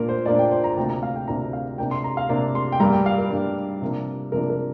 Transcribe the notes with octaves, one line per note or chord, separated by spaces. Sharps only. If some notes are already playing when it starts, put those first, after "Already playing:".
Already playing: A#2 A#3 D4 A#4
C5
A#2 A#3 D4 D5
G5
C5
A#5
D2 C3 A#3 D4 G5
A#5
F5
G5
D2 C3 A#3 D4 A#5
F5
C3 A#3 D4 G5
C6
A#5
F5
C3 A#3 D4
C6
G5
G2 G3 A#3 D4 A#5
G5
F5
A#4
G2 G3 A#3 D4
C3 F3 A#3 D4
C3 F3 A#3 D4 A#4
A#4